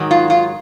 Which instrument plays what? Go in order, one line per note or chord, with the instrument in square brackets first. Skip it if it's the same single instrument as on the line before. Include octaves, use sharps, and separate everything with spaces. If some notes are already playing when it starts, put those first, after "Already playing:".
Already playing: [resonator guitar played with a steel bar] G#2 D#3 F#3
F4
F4